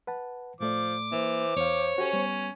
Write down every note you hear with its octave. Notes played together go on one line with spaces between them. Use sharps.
B4 F#5 A5
A2 F3 A3 D5 D6
E3 A#3 C5
E2 C#5 F5
C#4 F#4 G4 A4
G3 B3